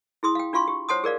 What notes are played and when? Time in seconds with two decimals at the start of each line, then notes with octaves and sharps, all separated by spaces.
0.23 E4 G#4 C6 D#6
0.35 F5 G5
0.53 D4 F4 F5 C6 C#6
0.68 G4
0.89 C5 C#5 F#5 A5 C6 D#6
1.04 G#4 A#4 D5 F5